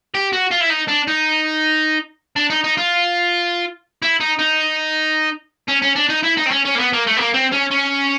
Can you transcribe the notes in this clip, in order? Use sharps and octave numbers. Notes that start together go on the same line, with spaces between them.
G4
F#4
F4
E4
D#4
D4
D#4
D4
D#4
D#4
F4
E4
D#4
D#4
C#4
C#4
D4
D#4
E4
D#4
C4
C#4
C#4
A#3
B3
A#3
A3
B3
A#3
C4
C#4
C#4